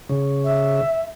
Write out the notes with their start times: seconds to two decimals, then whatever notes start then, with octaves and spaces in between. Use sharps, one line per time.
0.09 C#3
0.44 E5